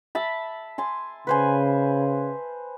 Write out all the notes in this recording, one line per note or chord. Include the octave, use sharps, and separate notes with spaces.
E5 A5 B5
G#5 A5 C6
C#3 B4 C5 G#5